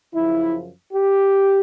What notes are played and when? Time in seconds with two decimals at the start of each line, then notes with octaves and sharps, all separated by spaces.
0.13 F#2 C#3 F3 E4
0.93 G4